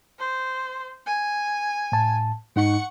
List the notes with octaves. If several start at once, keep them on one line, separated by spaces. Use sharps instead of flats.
C5
G#5
A2 A5
G#2 D#4 F#5 C#6